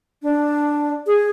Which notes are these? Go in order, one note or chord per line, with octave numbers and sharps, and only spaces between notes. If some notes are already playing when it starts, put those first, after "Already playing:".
D4
G#4